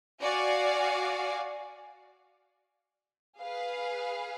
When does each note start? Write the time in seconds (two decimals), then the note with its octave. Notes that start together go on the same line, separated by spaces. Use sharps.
0.21 F#4 D5 F5 G#5
3.40 G#4 B4 F5